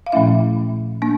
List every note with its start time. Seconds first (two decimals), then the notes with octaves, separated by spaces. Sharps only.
0.06 F5
0.12 A#2 F3 A3 C#4 E4 E5
1.02 A#3 D4